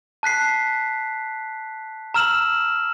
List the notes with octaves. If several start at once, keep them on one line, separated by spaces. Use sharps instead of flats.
A5 F#6 B6 C7
A#5 E6 F6 E7 F#7